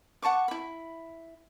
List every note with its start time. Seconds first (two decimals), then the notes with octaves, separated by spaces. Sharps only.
0.22 F#5 A5 C#6 D6
0.48 E4 B5